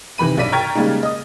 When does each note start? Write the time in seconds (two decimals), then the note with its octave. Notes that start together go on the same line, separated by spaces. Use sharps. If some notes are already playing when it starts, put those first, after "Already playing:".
0.18 C3 D#3 E3 B5 D#7
0.37 B1 G2 D5 B6 D#7
0.52 G5 A#5 C#6 F6 G#6 A6
0.75 C#3 G3 G#3 A#3 D#4
1.03 D#5 D#6